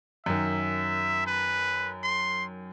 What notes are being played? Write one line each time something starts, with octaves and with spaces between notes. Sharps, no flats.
F#2 D#3 E5
B4
C6